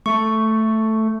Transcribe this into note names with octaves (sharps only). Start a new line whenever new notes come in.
A3 C#6